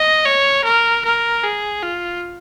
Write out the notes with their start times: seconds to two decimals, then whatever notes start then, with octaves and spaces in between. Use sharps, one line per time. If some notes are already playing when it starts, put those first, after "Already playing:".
Already playing: D#5
0.26 C#5
0.64 A#4
1.04 A#4
1.43 G#4
1.83 F4